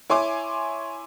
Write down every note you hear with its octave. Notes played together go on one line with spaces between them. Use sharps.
E4 C#5 G#5 C6 D6